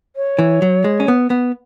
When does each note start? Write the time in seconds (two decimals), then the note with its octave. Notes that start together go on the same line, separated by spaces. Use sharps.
0.16 C#5
0.39 E3
0.62 F#3
0.84 G#3
1.00 C#4
1.08 B3
1.30 B3